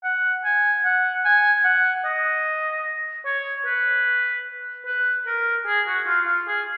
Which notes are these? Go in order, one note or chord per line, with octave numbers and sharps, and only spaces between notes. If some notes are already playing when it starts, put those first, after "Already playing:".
F#5
G#5
F#5
G#5
F#5
D#5
C#5
B4
B4
A#4
G#4
F#4
F4
F4
G#4